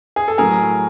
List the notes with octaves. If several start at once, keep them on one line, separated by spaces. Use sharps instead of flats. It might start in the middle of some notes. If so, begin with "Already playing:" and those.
G#4
A4
A2 F#3 G#4 A#4